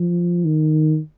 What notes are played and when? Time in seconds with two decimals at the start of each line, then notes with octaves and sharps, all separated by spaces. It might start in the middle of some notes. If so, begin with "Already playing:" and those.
Already playing: F3
0.45 D#3